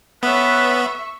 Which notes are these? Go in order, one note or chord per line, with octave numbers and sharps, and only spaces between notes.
B3 C#4 A4 B4 E5 C#6